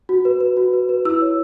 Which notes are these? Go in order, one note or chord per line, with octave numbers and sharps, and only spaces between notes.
F#4
B4
B4
F#4
B4
B4
E4 E6
C#5